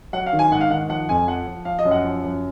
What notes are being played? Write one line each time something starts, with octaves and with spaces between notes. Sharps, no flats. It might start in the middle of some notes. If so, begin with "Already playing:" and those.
F#3 F#5
F5
D#3
G#5
G#2 F#5
F5
D#3 F#5
F3 F#5
F2 G#5
F3 F#5
F3
F3 F5
D#5
F#2
F#5
F3
F#2